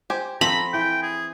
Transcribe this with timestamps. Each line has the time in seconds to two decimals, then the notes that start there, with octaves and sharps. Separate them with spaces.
0.10 G4 C5 G#5
0.41 F3 C4 A4 A#5 B5
0.74 E3 G5
1.03 G#4